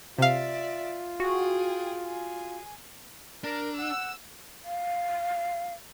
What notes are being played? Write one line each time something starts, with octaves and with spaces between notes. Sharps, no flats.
C3 F4 D5 E5 F5
F#4 G#4 G5
G#4
D4 A#4
F#5 E6
F5